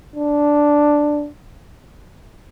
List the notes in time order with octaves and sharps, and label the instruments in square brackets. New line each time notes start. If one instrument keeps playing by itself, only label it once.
[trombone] D4